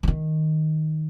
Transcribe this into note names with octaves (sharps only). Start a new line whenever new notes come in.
E3
D#3